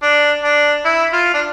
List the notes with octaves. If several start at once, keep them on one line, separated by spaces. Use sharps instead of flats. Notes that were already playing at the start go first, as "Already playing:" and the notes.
D4
D4
E4
F4
D4